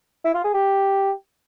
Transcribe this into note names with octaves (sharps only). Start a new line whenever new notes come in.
E4
F4
G#4
G4